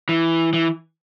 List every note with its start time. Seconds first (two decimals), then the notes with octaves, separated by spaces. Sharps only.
0.09 E3
0.53 E3